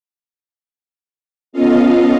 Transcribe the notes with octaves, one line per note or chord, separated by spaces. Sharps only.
B3 C#4 F4 A4 D#5 F5